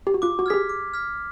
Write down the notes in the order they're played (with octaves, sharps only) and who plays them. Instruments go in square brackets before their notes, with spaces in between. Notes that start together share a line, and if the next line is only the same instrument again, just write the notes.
[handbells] G4
F#4
[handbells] F4 [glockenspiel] D6
[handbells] F#4
[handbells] G#4 [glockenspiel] F6 G#6 B6
[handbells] G4
[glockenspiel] D6
F6 G#6 B6